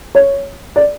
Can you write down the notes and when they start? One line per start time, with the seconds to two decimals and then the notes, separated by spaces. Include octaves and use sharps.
0.15 C#5
0.76 D5